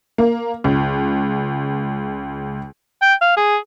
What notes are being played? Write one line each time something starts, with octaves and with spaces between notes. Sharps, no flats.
A#3
C#2
G5
F5
G#4